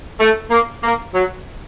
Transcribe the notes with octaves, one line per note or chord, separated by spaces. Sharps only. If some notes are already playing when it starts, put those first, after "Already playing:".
A3
A#3
A#3
F#3